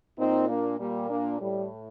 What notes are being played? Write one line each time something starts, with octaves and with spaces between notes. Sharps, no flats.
A#2 C4 D#4
A#3 D4
A#2 G3 A#3
A#3 D4
A2 G3